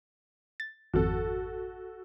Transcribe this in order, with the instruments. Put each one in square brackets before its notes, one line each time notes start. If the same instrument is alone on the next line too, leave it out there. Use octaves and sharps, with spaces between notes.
[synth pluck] A6
[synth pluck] G#1 F2 [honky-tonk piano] F#4 A4